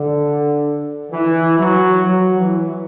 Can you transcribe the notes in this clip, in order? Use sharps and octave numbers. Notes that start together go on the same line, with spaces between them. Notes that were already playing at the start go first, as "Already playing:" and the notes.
Already playing: D3
E3
F#3
F#3
E3